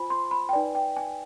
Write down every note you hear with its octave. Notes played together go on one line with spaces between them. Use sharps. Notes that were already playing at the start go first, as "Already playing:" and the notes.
Already playing: F4 C5 G#5 B5
C6
B5
G5
D#4 B4 D5 G#5
G5
G#5